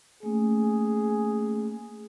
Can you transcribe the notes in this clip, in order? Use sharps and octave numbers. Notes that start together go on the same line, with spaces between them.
A3 A#3 C#4 G#4